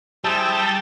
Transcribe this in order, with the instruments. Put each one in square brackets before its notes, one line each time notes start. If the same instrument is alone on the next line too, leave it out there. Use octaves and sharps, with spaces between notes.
[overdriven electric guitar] G3 [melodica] C4 E4 G#4 [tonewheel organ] A5 E6 G6